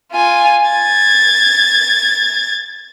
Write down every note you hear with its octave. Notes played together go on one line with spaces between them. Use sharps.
F4 G#5
G#6 A6